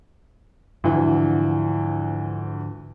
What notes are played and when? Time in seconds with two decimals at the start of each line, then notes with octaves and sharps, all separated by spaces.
0.84 D2 G#2 D3 E3 F3